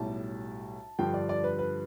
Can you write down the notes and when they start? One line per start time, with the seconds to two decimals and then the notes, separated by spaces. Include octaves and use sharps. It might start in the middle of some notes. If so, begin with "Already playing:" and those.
Already playing: B1 A2 G3 A5
0.99 G2 D3 F3 G5
1.14 D5
1.29 D5
1.44 B4
1.59 B4